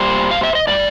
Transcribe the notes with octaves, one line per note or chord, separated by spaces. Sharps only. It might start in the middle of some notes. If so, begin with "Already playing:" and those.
Already playing: A#2 G3 C5
F5
E5
D#5
A2 E3 G3 D5